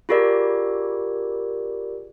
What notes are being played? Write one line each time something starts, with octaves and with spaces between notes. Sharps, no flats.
F4 G4 G#4 A#4 D5